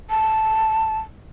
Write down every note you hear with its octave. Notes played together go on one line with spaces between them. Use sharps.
A5